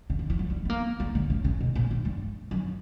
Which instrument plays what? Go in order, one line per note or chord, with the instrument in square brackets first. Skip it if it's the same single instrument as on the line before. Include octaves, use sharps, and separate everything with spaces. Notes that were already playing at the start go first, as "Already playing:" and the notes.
[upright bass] C#3
D3
E3
F#3
G3
B3
A#3
G3
D3
C#3
C#3
B2
A#2
G2
G2
F#2